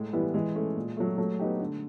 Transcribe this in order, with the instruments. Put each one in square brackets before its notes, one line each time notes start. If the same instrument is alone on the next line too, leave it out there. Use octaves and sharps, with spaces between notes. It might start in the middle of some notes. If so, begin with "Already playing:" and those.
Already playing: [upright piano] A2 [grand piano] G#3
[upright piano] E3 G3 B3 E4
[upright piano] E3 [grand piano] G#3
[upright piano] A3 C#4
A#2
F#3 A3
[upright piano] F#3 [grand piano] A3
[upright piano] B3 D#4 G4
D3